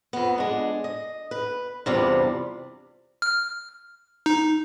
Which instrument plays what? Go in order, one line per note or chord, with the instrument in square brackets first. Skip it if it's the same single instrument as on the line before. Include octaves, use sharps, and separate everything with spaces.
[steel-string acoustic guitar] F2 B3
G#3 D4
D#5
B4
E2 G2 C3 F3 G3
[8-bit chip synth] F6
D#4